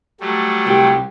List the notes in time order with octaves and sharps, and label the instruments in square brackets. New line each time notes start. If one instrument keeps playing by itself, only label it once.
[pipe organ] F#3 G3 A3
[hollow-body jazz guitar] C2 G4